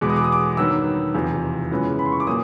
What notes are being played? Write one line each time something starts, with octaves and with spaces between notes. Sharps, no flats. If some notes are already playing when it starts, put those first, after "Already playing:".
E2 B2 G#3 B3 D6
D#6
D6
D#6
D6
G2 D#3 F#3 B3 E6
F1 E2 C3 F3
F#2 C#3 E3 G#3 B3
B5
C6
C#6
D6
A#2 F#3 A#3 D#6